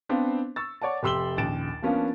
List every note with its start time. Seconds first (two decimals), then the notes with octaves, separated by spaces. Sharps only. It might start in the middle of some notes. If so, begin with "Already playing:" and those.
0.09 B3 C4 D4 C5 F5
0.56 C#6 E6 A6
0.82 C#5 D5 F#5 A5
1.03 F1 G4 C6 E6 F#7 G7
1.38 A#1 D#2 C#3 A6 D7 E7
1.82 F3 A#3 B3 C#4 D4 F4